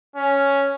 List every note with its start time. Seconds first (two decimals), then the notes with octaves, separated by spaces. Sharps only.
0.16 C#4